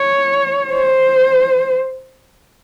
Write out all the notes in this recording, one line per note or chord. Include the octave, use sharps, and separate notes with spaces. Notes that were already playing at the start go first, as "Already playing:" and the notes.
Already playing: C#5
C5